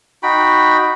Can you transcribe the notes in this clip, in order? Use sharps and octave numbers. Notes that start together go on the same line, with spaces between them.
D#4 F#4 G5 B5